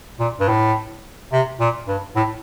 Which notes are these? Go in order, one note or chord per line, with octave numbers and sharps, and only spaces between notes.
A#2
G2
A2
C3
A#2
G2
A2